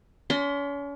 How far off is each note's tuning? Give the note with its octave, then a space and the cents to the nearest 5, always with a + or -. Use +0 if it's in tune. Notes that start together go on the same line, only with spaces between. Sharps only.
C#4 +40 C6 +0